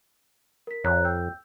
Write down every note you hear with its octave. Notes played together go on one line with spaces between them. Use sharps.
A#4 B6
F2 C#5 A#5 F#6
G5 E6 G6